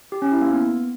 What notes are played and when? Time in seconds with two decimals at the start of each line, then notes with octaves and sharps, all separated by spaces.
0.12 G4
0.22 C#4
0.32 E4
0.41 A#3
0.51 B3